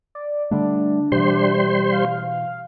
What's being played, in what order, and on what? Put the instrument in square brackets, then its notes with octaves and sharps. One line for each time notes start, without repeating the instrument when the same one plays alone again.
[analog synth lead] D5
[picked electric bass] D3 G3 A3 [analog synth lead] D4
[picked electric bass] B2 E3 [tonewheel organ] G3 C5 C6
[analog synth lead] F5